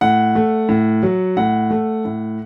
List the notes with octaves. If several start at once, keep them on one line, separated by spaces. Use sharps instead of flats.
A2 F#5
A3
A2
F#3
A2 F#5
A3
A2